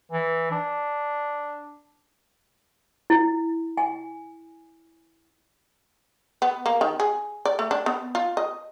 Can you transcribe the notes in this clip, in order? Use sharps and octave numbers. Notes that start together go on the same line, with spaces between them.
E3
D4
E4
G#5
B3
A#3
D#3
G#4
D5
A3
D4
B3
F4
D#5